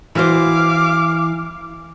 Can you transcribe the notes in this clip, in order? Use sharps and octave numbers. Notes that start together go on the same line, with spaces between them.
E3 F#4 C5 F5 D6